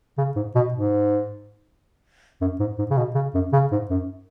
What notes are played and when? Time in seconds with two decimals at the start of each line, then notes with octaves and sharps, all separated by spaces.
0.18 C#3
0.36 G#2
0.55 B2
0.74 G#2
2.41 F#2
2.60 G#2
2.78 G#2
2.90 C#3
2.97 B2
3.15 C#3
3.34 F#2
3.53 C#3
3.72 G#2
3.90 F#2